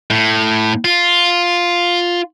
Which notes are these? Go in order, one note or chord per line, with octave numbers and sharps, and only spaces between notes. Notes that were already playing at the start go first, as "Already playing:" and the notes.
A2
F4